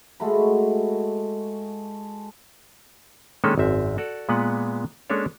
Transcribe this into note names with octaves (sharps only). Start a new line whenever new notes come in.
G#3 A3 F#4 B5
D#3 G#3 A#3 C#4 D4 A4
G#1 F#2 C4 E5
F#4 A4 D5
A#2 G#3 B3 B4 F#5
G#3 A#3 C#4 D4 A4 C#5